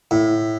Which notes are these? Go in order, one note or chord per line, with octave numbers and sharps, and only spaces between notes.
A2